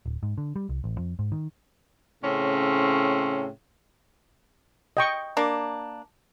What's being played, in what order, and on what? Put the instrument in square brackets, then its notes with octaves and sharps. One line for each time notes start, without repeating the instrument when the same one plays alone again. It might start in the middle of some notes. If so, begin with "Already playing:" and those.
[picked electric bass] D1
G#2
D3
G3
C2
A1
F2
G#2
D#3
[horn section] A2 C#3 C4 C#4
[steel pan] D#5 G5 C#6
[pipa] A#3 D4